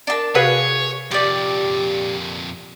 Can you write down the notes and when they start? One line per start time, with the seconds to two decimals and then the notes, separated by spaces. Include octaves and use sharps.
0.07 D4 A#4 D5 A5
0.35 C3 F#4 G#4 B4 C#5 F5
1.11 F2 A#2 G4 D5